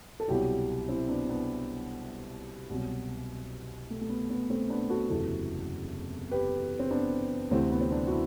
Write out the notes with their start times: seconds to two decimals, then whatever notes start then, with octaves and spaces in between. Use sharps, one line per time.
0.20 A4
0.28 C2 B2 F#3 E4 G4
0.89 C4 E4
1.09 B3 D4
1.29 B3 D4
2.70 C2 B2 F#3
3.90 A3
4.01 A3
4.09 B3
4.30 B3
4.50 A3 C4
4.70 B3 D4
4.90 F#4 A4
5.10 F#1 E2 C3 E3 F#4 A4
6.31 G4 B4
6.79 C4
6.90 B3 D4
7.51 D2 C3 E3 A3 C4
7.71 B3
7.81 C4
7.92 B3 D4
8.07 F#4
8.11 E4